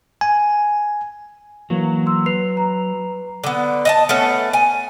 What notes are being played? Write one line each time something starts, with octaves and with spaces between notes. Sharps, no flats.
G#5
E3 F#3 A#3
C6 E6
B4 C7 F7
A#5
D3 B3
D#5 E5 A5
A3 B3 C#4
G#5